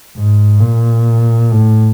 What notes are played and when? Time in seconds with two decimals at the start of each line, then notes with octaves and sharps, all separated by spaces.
0.17 G#2
0.61 A#2
1.52 A2